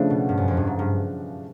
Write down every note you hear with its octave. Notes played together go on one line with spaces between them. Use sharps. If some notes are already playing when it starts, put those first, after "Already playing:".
Already playing: C#3 F3 A3 D4
B2
G2
F#2
F2
G2
G#2
G2